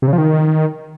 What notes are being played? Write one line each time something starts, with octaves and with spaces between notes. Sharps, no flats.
C3
C#3
F3
D#3